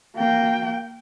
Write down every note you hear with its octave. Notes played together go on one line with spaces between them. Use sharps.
A#3 G5